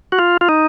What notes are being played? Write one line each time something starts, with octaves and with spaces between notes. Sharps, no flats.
F#4
F4
F4
D#4